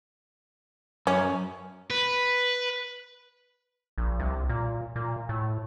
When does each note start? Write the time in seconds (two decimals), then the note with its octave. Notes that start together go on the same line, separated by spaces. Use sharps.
1.07 F#2 C#4
1.90 B4
3.98 A#1
4.20 C2
4.49 A#2
4.96 A#2
5.29 A2